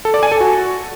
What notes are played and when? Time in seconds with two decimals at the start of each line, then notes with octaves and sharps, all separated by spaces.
0.05 A4
0.14 D5
0.23 G#5
0.32 A4
0.40 F#4